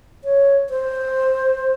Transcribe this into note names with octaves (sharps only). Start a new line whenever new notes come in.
C#5
C5